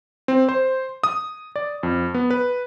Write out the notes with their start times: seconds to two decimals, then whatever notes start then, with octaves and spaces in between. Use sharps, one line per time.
0.28 C4
0.49 C5
1.03 D#6
1.56 D5
1.83 F2
2.14 B3
2.30 B4